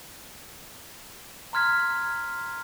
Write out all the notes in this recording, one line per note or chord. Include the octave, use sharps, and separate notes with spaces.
A#5 C6 F6 G#6 B6